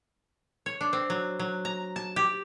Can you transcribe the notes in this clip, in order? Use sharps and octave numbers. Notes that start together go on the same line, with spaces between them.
C#5
D4
C4
F#3
F#3
A#5
A5
G4